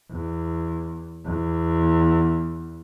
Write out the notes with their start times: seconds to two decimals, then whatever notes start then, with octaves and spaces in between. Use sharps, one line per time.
0.11 E2
1.25 E2